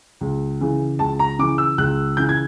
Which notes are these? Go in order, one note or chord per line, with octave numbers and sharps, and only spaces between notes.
C#2
C#3 E3
C#2 A5
A#5
C#3 E3 D6
E6
C#2 F#6
C#3 E3 G6
G#6